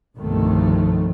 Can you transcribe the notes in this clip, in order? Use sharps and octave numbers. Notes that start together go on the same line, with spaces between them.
G1 C2 B2 D#3 F3 A3